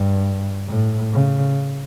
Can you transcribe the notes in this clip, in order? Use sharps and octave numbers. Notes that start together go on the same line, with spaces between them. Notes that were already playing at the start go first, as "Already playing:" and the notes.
Already playing: G2
A2
C#3